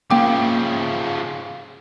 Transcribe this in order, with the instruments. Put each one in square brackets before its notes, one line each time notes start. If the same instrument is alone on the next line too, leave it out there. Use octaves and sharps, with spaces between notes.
[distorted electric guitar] C#3 F3 [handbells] A#3 G5 D6